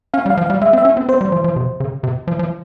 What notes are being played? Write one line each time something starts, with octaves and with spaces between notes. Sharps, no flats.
C#4 F5
G3
F5
F3
F5
G3
G#3 E5
C4
E5
C#4
C4
C4 C5
G3
F3
F3
C3
C#3
C3
F3
F3